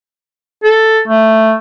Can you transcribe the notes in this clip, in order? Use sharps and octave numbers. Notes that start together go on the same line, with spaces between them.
A4
A3